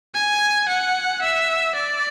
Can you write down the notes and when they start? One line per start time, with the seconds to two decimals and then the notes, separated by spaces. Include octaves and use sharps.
0.14 G#5
0.68 F#5
1.22 E5
1.75 D5